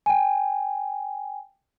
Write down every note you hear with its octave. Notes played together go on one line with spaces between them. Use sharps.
G5 G#5